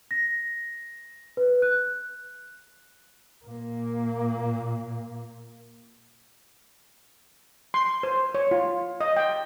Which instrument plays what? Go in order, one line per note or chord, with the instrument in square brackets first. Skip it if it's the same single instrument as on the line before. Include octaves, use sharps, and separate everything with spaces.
[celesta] A#6
B4
F#6
[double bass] A#2 A#3
[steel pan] C6
C5
C#5
F4
D#5
G5